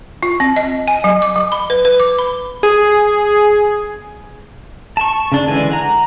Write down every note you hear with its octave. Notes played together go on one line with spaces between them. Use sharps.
F4
C4
D#5
G#5
F#3
D6
F#3
B5
B4
B4
D6
B5
G#4
A5 C#6
C#3 D4
D3 E3 G#3 G#5
F#5 A#5